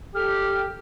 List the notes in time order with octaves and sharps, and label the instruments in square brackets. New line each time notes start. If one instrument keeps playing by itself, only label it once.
[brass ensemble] G4 [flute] A4 [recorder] F6